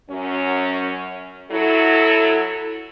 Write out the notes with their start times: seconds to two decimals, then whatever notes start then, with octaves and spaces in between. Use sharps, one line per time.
0.10 F#2 C#4
1.51 F#3 E4 A4